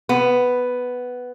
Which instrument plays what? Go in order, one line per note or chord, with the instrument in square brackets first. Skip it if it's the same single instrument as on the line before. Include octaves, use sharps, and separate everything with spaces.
[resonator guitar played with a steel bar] B3